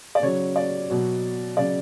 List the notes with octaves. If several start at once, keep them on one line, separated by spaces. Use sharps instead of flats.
D5
C#3 F#3 C#5
D5
B2 F#3
C#3 F#3 D5